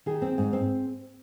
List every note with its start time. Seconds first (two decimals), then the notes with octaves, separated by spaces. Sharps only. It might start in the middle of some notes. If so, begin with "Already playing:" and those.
0.06 D#3 G#4
0.22 C4
0.38 G#2
0.53 C4